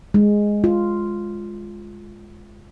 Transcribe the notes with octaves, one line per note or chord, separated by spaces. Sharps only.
G#3
F4